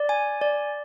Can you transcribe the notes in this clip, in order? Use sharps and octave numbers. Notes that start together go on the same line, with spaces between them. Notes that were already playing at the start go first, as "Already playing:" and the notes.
Already playing: D5
G#5
D5